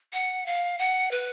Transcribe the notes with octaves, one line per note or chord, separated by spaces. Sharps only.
F#5
F5
F#5
B4